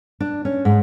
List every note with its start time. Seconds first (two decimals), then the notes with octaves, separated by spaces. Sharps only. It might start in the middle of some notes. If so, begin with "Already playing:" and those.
0.20 D4
0.45 C#4
0.65 G#2